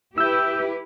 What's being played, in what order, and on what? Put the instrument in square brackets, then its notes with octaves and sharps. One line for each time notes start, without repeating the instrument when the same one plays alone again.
[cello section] E4 G4 B4 [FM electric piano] E6 G6